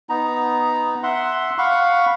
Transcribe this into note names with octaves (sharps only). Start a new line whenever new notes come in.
B3 D#4 A#5
E5 F#5 C6
F5 F#5 B5 C#6